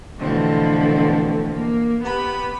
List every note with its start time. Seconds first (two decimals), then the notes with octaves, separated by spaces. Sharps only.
0.18 B2 D3 E3 F3 A3 C4
1.54 A#3
2.02 B3 G4 B4 B5